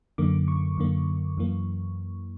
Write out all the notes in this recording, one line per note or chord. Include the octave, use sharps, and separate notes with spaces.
F#2 D3 A#3 D6
C#6
F#2 D3 A#3
F#2 E3 A#3